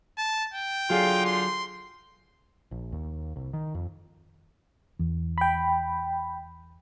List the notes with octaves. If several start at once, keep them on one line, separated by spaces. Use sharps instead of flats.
A5
G5
D3 F#3 F4 G#4
C6
A#1
D#2
C2
D#3
F2
E2
G5 B5